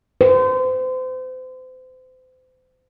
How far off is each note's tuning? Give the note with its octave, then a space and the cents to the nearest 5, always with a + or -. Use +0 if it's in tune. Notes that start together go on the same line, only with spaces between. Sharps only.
C5 -35